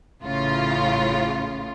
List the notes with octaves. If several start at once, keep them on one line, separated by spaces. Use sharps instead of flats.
A1 A2 C#3 F4